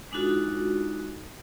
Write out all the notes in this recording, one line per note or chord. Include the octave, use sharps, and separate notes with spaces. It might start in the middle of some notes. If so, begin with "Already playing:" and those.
G#3 D4 D#4 F4 F#4 A4